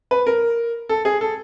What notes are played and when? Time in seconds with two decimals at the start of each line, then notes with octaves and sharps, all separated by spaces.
0.11 B4
0.27 A#4
0.89 A4
1.05 G#4
1.21 A4